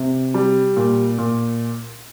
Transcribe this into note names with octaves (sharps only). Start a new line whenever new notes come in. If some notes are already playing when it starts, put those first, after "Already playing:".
Already playing: C3
G3
A#2
A#2